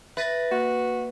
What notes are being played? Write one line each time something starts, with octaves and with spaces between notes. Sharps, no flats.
B4 E5 A6 A#6
A#3 F#4